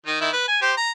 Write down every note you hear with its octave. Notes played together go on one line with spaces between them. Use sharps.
D#3 D#4
D#3 E4
B4
G#5
G4 C5
A#5